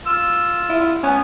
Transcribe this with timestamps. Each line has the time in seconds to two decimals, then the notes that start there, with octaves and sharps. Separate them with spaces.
0.06 F4 E6
0.69 E4
1.03 B3 C#4